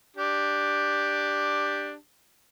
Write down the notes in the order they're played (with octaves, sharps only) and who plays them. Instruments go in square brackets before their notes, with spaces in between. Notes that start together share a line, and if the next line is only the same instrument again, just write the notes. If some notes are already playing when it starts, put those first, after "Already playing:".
[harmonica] D4 G4